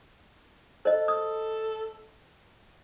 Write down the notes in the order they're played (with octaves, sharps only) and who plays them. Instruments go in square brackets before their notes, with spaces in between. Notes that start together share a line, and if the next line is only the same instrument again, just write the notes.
[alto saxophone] A4 [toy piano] C5 D#5
[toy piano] D#6